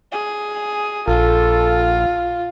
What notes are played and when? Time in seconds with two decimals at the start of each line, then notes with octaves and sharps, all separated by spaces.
0.12 G#4
1.08 A#1 F4 A4